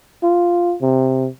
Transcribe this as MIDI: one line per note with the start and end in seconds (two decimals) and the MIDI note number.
0.23 0.74 65
0.82 1.28 48